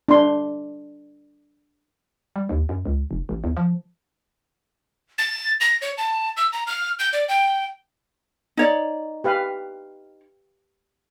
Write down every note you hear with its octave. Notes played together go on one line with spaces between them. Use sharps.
D4 C6
G3
D#2
F#2
C#2
F1
A1
E2
F3
A6
A#6
C#5
A5
E6
A#5
F6
G6
D5
G5
D#4 C#5 D5
G4 B4 F5